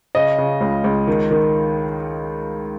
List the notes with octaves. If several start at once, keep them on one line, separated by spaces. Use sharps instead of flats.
C#3 D#5
C#3
C#2
C#2
D#3
D#3